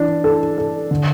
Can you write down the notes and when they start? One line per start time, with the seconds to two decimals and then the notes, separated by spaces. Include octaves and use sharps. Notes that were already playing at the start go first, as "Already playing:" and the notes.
Already playing: E3 D4
0.24 A4
0.58 A4
0.91 D3